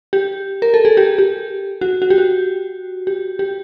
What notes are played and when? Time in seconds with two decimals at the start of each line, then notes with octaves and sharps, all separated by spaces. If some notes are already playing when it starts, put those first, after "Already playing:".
0.13 G4
0.62 A#4
0.74 A4
0.85 G#4
0.97 G4
1.18 G4
1.81 F#4
2.02 F#4
2.10 G4
2.18 F#4
3.07 G4
3.39 G4